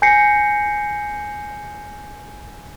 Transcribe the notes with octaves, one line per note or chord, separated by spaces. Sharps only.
G#5 G6 A#6 C7 C#7